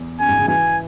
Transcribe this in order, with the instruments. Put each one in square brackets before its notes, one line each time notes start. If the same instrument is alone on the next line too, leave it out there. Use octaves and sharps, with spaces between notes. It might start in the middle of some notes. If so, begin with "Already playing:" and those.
Already playing: [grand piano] E2
[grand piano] F#2 [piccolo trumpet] G#5
[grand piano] G#2
C#3
[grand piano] E3 [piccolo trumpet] G#5